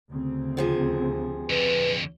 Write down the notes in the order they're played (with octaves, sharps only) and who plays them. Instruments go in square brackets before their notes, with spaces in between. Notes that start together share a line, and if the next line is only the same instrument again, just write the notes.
[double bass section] D2 C#3 C4
[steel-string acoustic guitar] C3 F3 G#4
[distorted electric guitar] F2 D3 [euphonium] B4